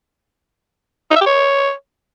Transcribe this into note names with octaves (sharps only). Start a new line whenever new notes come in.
D#4
E5
G4
C#5